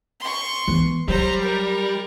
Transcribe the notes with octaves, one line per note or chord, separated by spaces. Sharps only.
C6 C#6
E3 B3
F#3 G3 C5 A#5
A#4